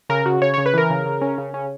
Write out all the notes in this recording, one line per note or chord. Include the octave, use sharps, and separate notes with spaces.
C#3 A#4
C#3 F#4
C#3 C#5
C#3 C#5
B4
E3 A#4
C#3
C#3
C#4
C#3
C#4